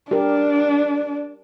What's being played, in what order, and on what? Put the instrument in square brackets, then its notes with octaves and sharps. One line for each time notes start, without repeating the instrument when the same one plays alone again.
[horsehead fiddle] D4 [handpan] G4 A#4